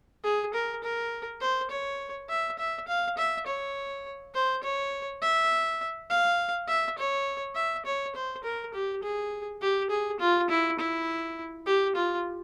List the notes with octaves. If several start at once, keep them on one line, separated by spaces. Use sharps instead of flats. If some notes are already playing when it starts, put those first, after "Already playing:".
G#4
A#4
A#4
C5
C#5
E5
E5
F5
E5
C#5
C5
C#5
E5
F5
E5
C#5
E5
C#5
C5
A#4
G4
G#4
G4
G#4
F4
E4
E4
G4
F4